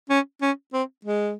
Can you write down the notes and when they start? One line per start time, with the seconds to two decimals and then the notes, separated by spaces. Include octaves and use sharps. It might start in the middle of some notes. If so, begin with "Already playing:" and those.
0.10 C#4
0.42 C#4
0.73 C4
1.05 G#3